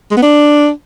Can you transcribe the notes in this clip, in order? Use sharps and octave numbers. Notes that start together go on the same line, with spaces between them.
G#3
B3
D4